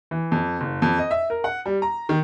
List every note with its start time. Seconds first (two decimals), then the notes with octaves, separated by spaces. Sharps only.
0.11 E3
0.32 F2
0.61 F#1
0.82 F2
0.98 D#5
1.11 E5
1.30 A#4
1.44 F#5
1.66 G3
1.82 A#5
2.09 D#3